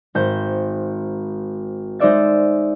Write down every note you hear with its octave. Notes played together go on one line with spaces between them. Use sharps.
G#1 C5 G6
G#3 D#4 C5 D5 E5 A6